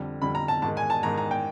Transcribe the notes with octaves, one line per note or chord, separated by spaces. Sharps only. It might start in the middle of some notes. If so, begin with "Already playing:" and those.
Already playing: F2 D3 G3
F2 D3 G3 B5
A#5
A5
G#2 D#3 G#3 A5
G#5
A5
G#2 D#3 G#3 A#5
A#5
G5